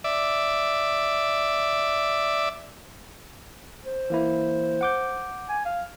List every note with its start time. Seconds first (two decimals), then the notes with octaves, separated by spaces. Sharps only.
0.04 D5 E5
3.85 C5
4.10 E3 A#3 E4
4.81 F#5 D6 G6
5.49 G#5
5.66 F5